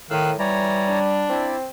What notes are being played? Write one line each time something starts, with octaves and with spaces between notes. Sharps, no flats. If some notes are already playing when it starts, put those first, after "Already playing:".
A2 D#3 F5 E6 F#6
E3 G3 C#5 D5 A#5
D4
C4 E4 D5